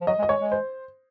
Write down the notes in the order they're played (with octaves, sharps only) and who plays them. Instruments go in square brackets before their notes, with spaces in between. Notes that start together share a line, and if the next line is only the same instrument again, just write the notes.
[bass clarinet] F3
[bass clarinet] F#3 [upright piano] D#5
[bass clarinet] G#3
[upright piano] D#5
[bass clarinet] G#3 [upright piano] C#5
[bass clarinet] G#3
[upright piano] C5